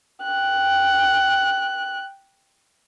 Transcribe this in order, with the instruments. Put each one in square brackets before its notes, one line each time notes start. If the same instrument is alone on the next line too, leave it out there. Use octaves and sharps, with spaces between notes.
[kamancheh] G5 F#6